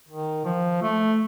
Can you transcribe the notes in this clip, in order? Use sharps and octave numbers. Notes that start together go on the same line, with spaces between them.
D#3
F3
A3